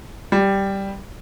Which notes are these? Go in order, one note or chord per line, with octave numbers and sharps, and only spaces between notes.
G3